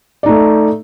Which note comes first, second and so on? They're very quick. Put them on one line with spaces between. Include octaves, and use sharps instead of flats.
D5 D#4 A3